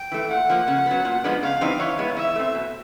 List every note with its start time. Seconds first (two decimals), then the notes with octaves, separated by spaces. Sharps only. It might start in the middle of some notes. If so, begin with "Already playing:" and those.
Already playing: G5
0.12 E3 A3
0.30 A#2 F#5
0.50 F3 A#3
0.68 C#3
0.86 F#3 B3
1.05 A#2
1.24 F3 G#3 B3 D4
1.42 C#3 F5
1.61 E3 G3 C4 D#4
1.79 E3 C#5
1.98 G#3 B3 E4
2.17 E3 E5
2.36 A3 C4
2.55 B2